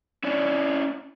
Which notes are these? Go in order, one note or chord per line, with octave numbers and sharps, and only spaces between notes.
C#4 E4 C#5 D5